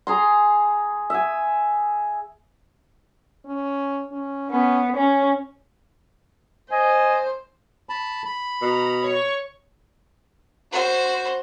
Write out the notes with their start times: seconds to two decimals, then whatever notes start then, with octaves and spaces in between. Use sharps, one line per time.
0.07 G#4 A#5 C6
1.10 E5 G#5
3.45 C#4
4.12 C#4
4.50 B3 C#4
4.96 C#4 C#5
6.72 C5 D#5 G#5
7.89 A5 B5
8.25 B5
8.61 B2 A#5
9.03 C#5 C#6
10.71 F#4 C5